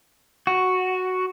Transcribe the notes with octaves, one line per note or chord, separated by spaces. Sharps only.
F#4